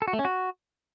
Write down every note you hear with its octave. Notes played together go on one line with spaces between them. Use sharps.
A4
F#4
A3
C#4
F#4